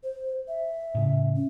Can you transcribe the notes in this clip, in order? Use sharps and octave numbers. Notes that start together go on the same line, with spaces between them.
C5
E5
A2 C#3
C#4